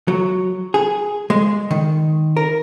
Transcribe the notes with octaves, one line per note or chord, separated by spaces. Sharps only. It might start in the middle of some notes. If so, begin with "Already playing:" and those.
F#3
G#4
G#3
D#3
A#4